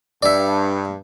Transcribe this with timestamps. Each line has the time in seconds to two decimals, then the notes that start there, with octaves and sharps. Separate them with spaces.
0.23 G2 D5 E5